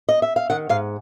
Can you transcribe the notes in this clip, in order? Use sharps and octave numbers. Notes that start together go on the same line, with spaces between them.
D#5
E5
F5
D#3 F#5
G#2 F5